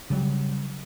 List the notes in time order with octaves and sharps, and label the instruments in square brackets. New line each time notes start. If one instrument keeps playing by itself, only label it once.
[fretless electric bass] C#3 F#3 G3